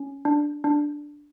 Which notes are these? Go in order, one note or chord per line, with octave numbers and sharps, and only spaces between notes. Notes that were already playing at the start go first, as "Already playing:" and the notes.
Already playing: C#4
D4
D4